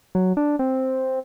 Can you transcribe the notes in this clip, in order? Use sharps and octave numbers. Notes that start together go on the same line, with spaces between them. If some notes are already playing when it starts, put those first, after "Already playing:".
F#3
D4
C4